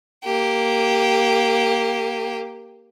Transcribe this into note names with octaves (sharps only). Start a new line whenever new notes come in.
A#3 G4